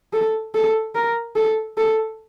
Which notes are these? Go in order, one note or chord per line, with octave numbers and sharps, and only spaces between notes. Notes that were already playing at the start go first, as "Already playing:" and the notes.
A4
A4
A#4
A4
A4